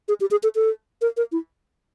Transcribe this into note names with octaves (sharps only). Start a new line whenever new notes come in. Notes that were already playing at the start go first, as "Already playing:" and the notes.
G#4
G4
G#4
A4
A4
A#4
A#4
E4